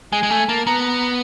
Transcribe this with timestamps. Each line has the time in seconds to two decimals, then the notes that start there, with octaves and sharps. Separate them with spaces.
0.12 G#3 G#5
0.23 G#3
0.30 A3 G#5
0.48 A#3 A5
0.67 B3 A#5
0.85 A#5